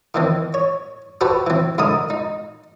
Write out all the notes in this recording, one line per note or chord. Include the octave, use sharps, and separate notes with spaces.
D#3 E3 C4
C#5
F#4 G4 A4 B4 C5 F#5
E3 C4
G#2 D3 G#3 A#4 D#6
D#4